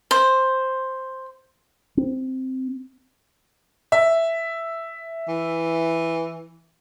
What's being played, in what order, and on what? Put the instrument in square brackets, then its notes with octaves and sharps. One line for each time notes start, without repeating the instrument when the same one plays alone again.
[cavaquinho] C5
[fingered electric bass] C4
[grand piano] E5
[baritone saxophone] E3